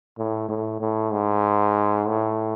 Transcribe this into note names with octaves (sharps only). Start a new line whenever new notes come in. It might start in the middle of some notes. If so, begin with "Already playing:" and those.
A2
A2
A2
G#2
A2